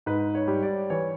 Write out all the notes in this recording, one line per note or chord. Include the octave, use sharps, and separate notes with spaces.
G#2 B4
C#5
G3
D5
E3 C#5